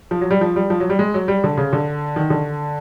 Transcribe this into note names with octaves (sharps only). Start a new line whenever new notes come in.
F3
F#3
G3
F3
G3
F3
F#3
G3
G#3
F#3
G3
D3
C#3
D3
D#3
D3